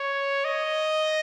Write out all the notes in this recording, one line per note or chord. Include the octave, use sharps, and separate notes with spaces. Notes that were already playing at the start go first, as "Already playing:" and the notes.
Already playing: C#5
D#5